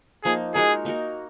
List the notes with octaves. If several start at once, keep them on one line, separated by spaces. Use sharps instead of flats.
F3 A#3 D#4 G#4
G#3 D#4 F#4 G#4 A#4
A#3 D#4 F#4 A#4